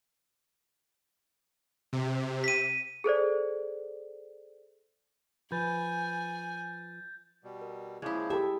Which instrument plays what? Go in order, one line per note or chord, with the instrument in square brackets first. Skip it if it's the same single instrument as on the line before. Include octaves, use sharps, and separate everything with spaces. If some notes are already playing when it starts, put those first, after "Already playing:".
[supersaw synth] C3
[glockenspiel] B6 D#7
[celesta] G#4 A4 C5 D5
[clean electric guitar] F3 B4 [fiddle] G#5 [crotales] G6 A6
[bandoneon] B2 G3
[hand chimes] A#4
[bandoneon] C#3 F3 A#3 [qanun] G#3 E4 [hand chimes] D#6 G6 G#6
[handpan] G4 A4 [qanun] E5 [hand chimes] G5 A5 B5